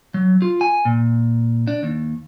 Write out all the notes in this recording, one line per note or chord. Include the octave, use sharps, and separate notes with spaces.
F#3
F4
G#5
A#2
D4
D#2